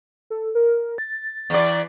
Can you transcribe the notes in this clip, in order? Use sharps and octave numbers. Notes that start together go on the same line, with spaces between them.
A4
A#4
A6
E2 D5